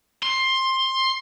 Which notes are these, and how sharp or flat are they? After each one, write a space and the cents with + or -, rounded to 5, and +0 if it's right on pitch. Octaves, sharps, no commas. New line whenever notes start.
C6 +15